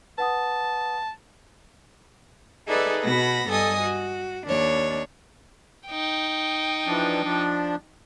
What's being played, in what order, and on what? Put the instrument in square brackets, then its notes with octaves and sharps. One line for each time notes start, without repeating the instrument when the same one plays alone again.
[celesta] B4 F#5 D#6 [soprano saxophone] A5
[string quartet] D#4 G#4 A4 B4 D5 E5
B2 B3 F#4 B5 A#6
G2 A4 D#5 G#5 D#6
F#4
D#2 D4 C#5
[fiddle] D#4 G5
[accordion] E3 F3 D4
F3 D4